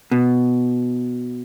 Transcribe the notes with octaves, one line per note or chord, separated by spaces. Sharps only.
B2